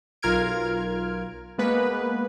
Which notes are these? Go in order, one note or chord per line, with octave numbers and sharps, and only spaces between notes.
B1 F4 A#4 F6 G#6 D7
G#3 A#3 B3 B4